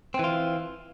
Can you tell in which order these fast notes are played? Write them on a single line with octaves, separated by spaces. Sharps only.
C4 E3 F4